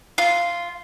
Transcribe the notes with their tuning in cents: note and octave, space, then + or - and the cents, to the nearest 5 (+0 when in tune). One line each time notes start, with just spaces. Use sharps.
F4 -10